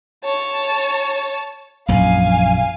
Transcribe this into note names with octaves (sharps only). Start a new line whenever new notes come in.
C#5 A5
A#1 F#2 F3 F5 G#5